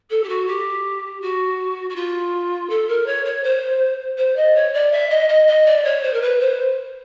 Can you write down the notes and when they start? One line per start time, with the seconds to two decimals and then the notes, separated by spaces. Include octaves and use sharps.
0.10 A4
0.23 G4
0.29 F#4
0.47 G4
1.21 F#4
1.89 F#4
1.95 F4
2.69 A4
2.88 A#4
3.06 C#5
3.25 C#5
3.43 C5
4.17 C5
4.36 D#5
4.55 C#5
4.73 D5
4.92 E5
5.10 D#5
5.28 D#5
5.47 D#5
5.66 D5
5.84 C#5
6.03 C5
6.13 A#4
6.21 B4
6.40 C5